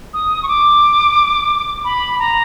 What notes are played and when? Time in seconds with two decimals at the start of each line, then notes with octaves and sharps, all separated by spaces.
0.14 D#6
0.43 C#6
0.48 D6
1.84 B5
2.19 A#5